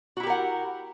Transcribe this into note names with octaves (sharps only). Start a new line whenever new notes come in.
E4 F#4 G4 A#4 F#5